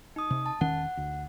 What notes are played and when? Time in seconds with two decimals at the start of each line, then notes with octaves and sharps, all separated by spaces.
0.16 D#4 D#6
0.30 C3
0.46 A5
0.61 E1 D#3 C#4 F#5
0.97 D2